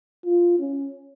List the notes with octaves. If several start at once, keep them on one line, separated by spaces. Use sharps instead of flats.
F4
C#4